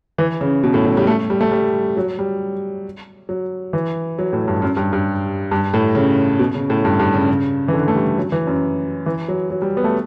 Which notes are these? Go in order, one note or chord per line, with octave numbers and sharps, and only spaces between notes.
E3
C#3
B2
A2
F#3
G3
A3
G3
A3
G3
F#3
G3
F#3
E3
F#3
A2
G2
F#2
G2
G2
G2
A2
C#3
B2
C#3
A2
G2
G2
C#3
C#3
E3
D3
A3
G3
F#3
E3
F#2
E3
F#3
F#3
G3
B3
A3